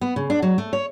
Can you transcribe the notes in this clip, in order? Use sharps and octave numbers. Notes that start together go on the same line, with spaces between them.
B3
C#3
D4
F#3
A3
C#5